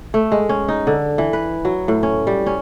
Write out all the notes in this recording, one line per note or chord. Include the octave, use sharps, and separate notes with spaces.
A3
G#3
C#4
D#4
D3
E3
B4
F#3
A2
C#4
G3
C#4